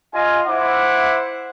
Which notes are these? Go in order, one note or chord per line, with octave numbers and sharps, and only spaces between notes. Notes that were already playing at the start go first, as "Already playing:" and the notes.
F4 D#5 F5 G#5
E4 C5 E5 F#5 D6